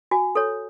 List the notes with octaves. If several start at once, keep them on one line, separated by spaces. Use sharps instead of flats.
F#4 G#5
A4 C#5